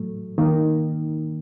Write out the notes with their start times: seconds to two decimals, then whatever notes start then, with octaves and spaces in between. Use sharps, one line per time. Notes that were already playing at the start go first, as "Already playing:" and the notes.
Already playing: A2 F#3 A3
0.38 D#3 A#3 D#4